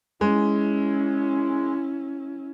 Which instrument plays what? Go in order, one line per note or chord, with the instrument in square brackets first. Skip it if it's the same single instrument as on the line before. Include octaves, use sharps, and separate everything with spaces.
[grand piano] G#3 [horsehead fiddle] C#4 E4